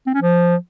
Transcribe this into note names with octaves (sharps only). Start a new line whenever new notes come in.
C4
C#4
F3